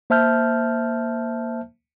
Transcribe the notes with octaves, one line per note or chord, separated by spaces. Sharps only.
A#3 C5 E5 A5 F6 G6